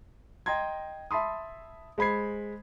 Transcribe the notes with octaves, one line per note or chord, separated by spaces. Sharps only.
D#5 G5 A#5 C6 G#6
E5 A5 B5 C6 D#6
G#3 C5 B5 G#6 C7